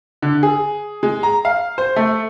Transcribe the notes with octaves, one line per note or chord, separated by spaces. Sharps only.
D3
G#4
G#3
A#5
F5
C5
A3